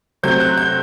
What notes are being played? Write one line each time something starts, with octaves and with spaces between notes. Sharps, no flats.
C3 F#3 A3 C4 G6
F#6
G6